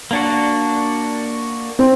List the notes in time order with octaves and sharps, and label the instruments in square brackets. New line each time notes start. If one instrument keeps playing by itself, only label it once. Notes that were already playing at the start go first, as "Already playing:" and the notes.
[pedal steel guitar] A#3 D4 F#4
[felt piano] C4